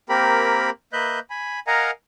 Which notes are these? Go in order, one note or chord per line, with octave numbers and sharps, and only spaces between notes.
A#3 C4 G4 A#4 B5
A#3 B4 D#5 E5 F#6 G6
G#5 B5
A#4 D#5 F5 F#5 G#5 A#5